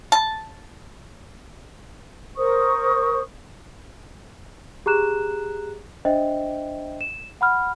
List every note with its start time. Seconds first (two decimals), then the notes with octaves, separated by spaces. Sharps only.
0.12 A5
2.37 A#4 C5 C#6 D#6
4.86 G4 G#4 A#5 F#6 E7
6.05 D4 C5 D#5 E5 G5
7.01 E7
7.41 F#5 B5 F6